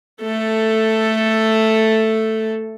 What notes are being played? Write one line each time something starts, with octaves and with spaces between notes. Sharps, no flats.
A3 A4